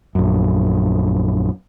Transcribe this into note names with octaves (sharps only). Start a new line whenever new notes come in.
A#1 F#2